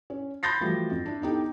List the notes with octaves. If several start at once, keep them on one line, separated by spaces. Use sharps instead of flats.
C#4
B5 C6 G6 A6 A#6 C7
E3 F3 G3 A3 F#4
F2
D4 E4
B3 D#4 G4 A4